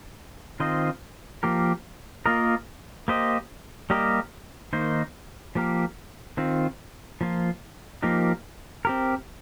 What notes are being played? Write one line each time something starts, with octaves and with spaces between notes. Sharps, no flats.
D#3 C4 F4 C5 D#5
F3 A#3 G4 A#4
A#3 F4 A#4 D#5
A#3 G4 C5 D#5
G3 A#3 G4 A#4 D#5
D#3 A#3 D#4 C5
F3 A#3 G4 A#4
D#3 C4 F4
F3 A#3 F4
F3 A#3 D#4 G4 A#4
C4 G4 A#4